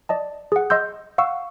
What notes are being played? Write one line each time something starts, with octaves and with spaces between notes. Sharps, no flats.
D5 D#5 A5
G#4 F#5
D#5 C6 E6 G6
F5 F#5 C#6 E6